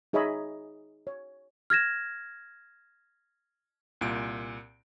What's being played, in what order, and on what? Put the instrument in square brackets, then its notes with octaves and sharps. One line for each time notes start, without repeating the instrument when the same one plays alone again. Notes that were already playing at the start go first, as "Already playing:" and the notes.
[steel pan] D#4 G#4 C#5 D#5 E5 B5
C#5
[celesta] F6 G#6 A#6 E7
[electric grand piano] C2 A#2 D7